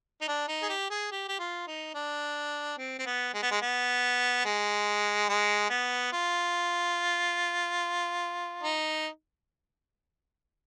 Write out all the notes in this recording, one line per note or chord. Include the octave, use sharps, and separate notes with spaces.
D#4
D4
D#4
G#4
G4
G#4
G4
G4
F4
D#4
D4
C4
C4
B3
G#3
B3
G#3
B3
G#3
G#3
B3
F4
D#4